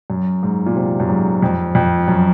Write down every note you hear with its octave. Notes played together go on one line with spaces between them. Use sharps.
F#2
G#2
A#2
C3
F#2
G#2
F2
F2
F#2